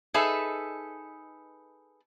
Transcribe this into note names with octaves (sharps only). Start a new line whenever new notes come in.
D#4 G#4 A4 B4 E5